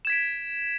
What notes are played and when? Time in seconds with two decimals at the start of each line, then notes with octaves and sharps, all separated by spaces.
0.05 E7
0.07 G#6
0.10 B6
0.12 D7